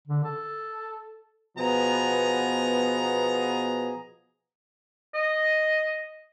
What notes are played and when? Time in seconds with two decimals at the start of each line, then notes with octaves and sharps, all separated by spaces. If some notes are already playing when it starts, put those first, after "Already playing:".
0.08 D3
0.24 A4
1.58 B2 F3 B3 G#4 A#5
5.15 D#5